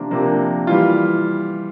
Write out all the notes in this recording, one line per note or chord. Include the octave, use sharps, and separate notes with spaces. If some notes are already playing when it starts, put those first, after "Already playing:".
Already playing: C3 F3 A#3 D4 A#4
C3 F3 A#3 D4
E3 G3 F4